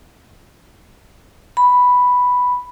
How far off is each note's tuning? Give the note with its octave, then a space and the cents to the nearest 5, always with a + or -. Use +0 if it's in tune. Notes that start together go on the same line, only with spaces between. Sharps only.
B5 +0